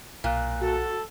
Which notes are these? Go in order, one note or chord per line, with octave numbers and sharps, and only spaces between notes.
B1 A#2 F#6
F#4 A4